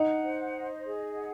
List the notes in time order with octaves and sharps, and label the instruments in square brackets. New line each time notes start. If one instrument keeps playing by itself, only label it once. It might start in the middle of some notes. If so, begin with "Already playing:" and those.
Already playing: [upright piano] D#4 [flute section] F#5
[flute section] C5
D#5
G#4
F#5